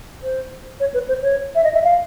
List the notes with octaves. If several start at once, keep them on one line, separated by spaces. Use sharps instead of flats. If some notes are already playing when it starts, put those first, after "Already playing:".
C5
C#5
B4
C5
C#5
E5
D#5
E5
F5